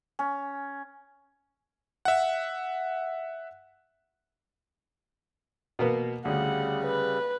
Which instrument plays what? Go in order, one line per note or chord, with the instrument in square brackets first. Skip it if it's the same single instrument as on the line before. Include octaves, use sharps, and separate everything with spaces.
[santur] C#4
[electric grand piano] E5 F#5
[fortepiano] B2 A#3 B3
[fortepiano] D2 [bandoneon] C#3 G3 [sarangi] F#5
[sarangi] B4